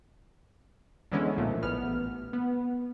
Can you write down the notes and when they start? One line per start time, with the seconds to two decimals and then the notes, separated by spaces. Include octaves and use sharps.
1.12 D3 E3 G#3 B3 C#4 E4
1.37 B1 A#2 F3 A3
1.62 A1 B3 F6
2.33 B3